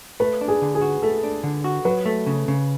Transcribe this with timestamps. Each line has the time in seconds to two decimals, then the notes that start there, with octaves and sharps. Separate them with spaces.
0.20 A3 B4
0.41 D4
0.48 G#4
0.62 D3
0.75 G#4
0.81 F#4
1.02 A3 A4
1.23 D4
1.43 D3
1.64 F#4
1.85 F#3 B4
2.06 A3
2.26 C#3
2.48 C#3